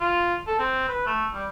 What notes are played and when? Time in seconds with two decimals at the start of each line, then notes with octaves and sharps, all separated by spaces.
0.01 F4
0.47 A4
0.59 C4
0.88 B4
1.06 A3
1.34 G3